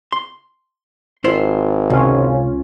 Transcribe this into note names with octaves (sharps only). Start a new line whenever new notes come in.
C6
G#1 E4 F4 C5
C#2 C3 C#4 F4